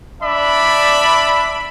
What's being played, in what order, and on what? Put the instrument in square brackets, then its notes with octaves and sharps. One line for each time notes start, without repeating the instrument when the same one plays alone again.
[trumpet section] D4 D5 E5 B5